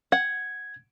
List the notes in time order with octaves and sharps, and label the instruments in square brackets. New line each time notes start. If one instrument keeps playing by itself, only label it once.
[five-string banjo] F#5 [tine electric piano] G#6